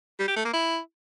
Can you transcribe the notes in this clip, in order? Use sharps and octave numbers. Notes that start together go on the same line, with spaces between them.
G3
G4
A3
A#3
E4